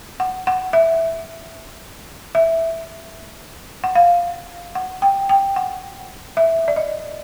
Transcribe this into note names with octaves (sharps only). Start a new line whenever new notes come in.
F#5
F#5
E5
E5
F#5
F5
F#5
G5
G5
F#5
E5
D5
D#5